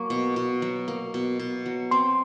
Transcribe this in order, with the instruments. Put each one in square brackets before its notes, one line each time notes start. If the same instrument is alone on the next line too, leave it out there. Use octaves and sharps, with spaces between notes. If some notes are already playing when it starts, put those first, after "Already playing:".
Already playing: [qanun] F#3 A#3 [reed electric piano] C#6
[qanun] B2
B2
F#3
A#3
B2
B2
F#3
[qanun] C4 [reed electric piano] C6